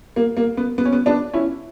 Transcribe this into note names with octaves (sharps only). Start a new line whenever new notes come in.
A#3
A#3
B3
B3
C#4
B3
B3 D4
C#4 E4